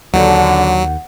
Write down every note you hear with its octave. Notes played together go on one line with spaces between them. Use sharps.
D#2 D3 F#3 F#5